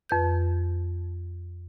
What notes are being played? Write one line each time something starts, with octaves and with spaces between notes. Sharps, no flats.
F2 B4 G6